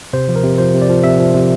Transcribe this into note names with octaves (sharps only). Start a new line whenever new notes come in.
C3 C5
F3
A#4
C3
F3 C5
C3
D5
F3
C3 E5
F3
C3